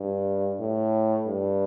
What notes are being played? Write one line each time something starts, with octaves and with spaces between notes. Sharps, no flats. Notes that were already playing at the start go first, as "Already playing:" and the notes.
Already playing: G2
A2
G2